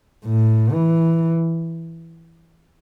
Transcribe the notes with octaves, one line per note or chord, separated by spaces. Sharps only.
A2
E3